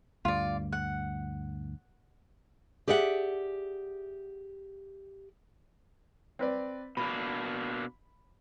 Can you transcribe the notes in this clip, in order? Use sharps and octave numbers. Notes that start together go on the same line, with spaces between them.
D2 G2 F4 D5
F#5
G4 G#4 D5 E5 F#5
C4 B4 D5
B2 A#3 D4 B5